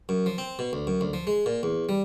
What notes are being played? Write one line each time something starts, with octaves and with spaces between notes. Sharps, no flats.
F#2
F3
C4
B2
D2
F#2
D2
F3
G#3
A#2
E2
G3